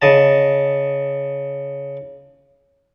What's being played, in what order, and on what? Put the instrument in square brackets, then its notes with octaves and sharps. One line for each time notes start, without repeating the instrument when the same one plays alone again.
[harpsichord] C#3 D#5 A5